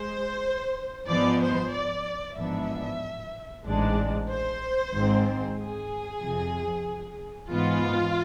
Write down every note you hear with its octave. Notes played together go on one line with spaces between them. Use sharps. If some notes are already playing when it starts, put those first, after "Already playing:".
Already playing: G#3 C5
G#2 F3 B3 D5
C5
D5
A1 G#2 F3 B3 D4 E5
A1 G#2 G#3 D4
C5
G#1 G#2 G#3 C4
G#4
F2 C3 F3
G#2 E3 B3 F4